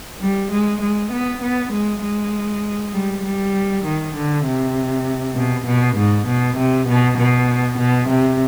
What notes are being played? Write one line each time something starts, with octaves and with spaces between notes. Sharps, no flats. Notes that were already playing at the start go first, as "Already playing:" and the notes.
G3
G#3
G#3
B3
B3
G#3
G#3
G3
G3
D#3
D3
C3
B2
B2
G#2
B2
C3
B2
B2
B2
C3